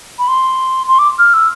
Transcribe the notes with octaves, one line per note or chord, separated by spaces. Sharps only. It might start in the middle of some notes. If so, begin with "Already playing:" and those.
B5
C6
C6
D6
F6
E6